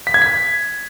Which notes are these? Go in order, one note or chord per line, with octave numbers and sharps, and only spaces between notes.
B6
G#6
B6